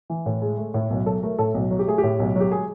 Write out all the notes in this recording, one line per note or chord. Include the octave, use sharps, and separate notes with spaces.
E3
A2
G#3
A3
A2
B1
F#3 A4
A3 A#4
A2 A4
B1
F#3
G4
A3 G#4
G4
A2
B1
F#3 G4
G#3 G#4